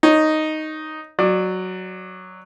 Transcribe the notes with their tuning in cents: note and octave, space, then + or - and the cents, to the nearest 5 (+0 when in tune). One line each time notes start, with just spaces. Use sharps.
D#4 +0 C#5 -10
F#3 +0 D5 +25